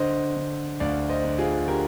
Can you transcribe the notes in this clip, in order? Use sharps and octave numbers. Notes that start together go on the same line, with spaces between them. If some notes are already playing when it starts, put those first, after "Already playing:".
Already playing: D3 C5 D#5
D3
D2 D5 F5
C5 D#5
D3
F4 G#4
D3 G4 A#4